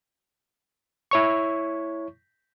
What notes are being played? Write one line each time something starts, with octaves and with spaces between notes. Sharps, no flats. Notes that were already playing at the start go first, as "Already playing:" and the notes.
E4 C#5 C#6